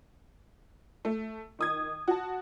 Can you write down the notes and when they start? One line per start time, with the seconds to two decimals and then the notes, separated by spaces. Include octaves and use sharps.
1.05 A3
1.59 D#3 D#6 G#6
2.08 F#4 A5